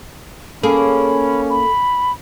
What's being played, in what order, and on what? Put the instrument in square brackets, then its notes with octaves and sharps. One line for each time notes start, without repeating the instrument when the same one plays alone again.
[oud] A#3 G#4 [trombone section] C#4 [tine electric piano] A4 [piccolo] B5
[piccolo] B5